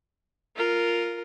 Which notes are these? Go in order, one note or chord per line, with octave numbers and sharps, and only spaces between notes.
F4 A#4